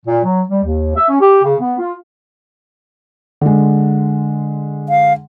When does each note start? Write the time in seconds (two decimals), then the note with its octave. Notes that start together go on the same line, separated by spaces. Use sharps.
0.06 A#2
0.25 F#3
0.50 G3
0.63 D#2
0.96 E5
1.09 C#4
1.21 G4
1.44 C#3
1.61 B3
1.79 F4
3.41 D3 G#3
4.89 F5